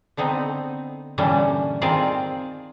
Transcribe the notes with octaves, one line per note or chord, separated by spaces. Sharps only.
D3 B3 C4 D#4
A#2 D3 E3 G3 C#4
D#3 C4 F4 G#4 D5 A5